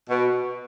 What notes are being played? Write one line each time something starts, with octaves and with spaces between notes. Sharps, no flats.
B2